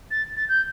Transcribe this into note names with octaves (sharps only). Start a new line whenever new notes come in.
A6
A6
G6